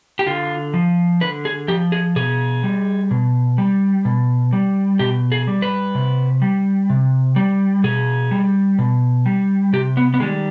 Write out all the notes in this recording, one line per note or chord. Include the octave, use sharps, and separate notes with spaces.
G4
D3 F4
F3
D3 B4
G#4
F3 G4
G#4
B2 G#4
G3
B2
G3
B2
G3
B2 G4
G#4
G3
B4
C3
G3
C3
G3
B2 G#4
G3
B2
G3
C3 G4
B3
B3
D#3 G3 G#3